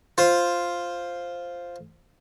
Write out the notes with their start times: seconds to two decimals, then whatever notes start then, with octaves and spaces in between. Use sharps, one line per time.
0.18 F4 C5